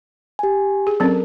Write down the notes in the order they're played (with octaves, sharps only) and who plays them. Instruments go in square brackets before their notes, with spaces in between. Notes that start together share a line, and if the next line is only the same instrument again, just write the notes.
[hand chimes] G4 G#5
[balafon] G#4
[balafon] F#3 C4 C#4 [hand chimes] A4 A#4